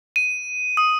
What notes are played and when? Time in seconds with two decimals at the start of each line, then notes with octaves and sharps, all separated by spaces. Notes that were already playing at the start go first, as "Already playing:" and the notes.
0.16 D#7
0.77 D#6